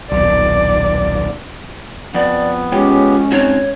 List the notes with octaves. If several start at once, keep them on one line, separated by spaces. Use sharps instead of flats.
D#1 B1 D5
F2 B3 D5
G#3 C#4 F4 G4 C#5 G5
C4 D#4 F#4 C#5